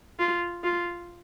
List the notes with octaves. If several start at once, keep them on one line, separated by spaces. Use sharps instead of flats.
F4
F4